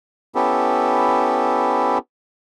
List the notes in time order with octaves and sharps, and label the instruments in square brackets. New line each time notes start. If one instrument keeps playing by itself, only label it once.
[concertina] B3 C#4 E4 G4 A4